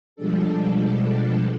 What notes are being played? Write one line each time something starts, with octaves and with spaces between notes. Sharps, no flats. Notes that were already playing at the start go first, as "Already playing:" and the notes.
B2 F3 G3 G#3 D4 A4